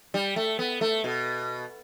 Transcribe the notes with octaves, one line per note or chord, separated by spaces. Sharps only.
G3
A3
B3
A3
B2